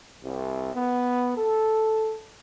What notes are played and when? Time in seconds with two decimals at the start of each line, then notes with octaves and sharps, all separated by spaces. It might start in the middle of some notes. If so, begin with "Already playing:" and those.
0.24 C2
0.74 B3
1.36 A4